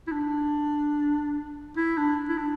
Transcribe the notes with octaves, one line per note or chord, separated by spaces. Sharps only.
E4
D4
E4
D4
E4
D4